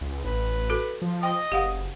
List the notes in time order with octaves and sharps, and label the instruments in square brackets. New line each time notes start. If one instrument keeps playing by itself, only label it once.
[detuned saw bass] C#2
[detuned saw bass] A1 [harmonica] B4
[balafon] F#4 A4
[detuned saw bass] F3
[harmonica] D#5 D#6 [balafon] G5
[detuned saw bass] F#1 [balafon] G4 F5 F#5